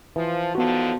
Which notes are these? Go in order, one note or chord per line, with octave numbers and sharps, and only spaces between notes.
E3 F3
D3 D#3 F3 B3 F#4